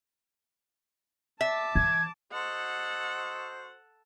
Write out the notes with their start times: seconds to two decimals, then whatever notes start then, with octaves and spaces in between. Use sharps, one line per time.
1.41 E5 A5 D6
1.75 E3 G#6
2.32 F#4 A4 C5 D#5 F#5